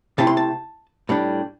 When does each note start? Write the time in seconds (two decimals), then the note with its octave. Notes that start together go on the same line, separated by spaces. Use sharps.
0.18 C3 A3 C4 E4 A5
0.27 C6
0.37 A5
1.09 A2 G3 D4